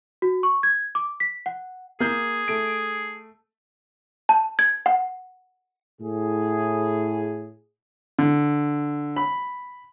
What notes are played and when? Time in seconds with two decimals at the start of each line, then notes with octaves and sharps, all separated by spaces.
0.22 F#4
0.43 C#6
0.63 G#6
0.95 D6
1.20 B6
1.46 F#5
2.00 A#3 G#4 G6
2.48 A3 D7
4.29 A5
4.59 G#6
4.86 F#5
6.01 A2 G#4
8.19 D3
9.16 B5